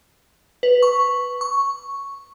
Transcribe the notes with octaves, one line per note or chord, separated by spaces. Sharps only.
B4
C#6
C#6